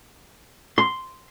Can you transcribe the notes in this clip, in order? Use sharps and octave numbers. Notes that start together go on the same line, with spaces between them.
C6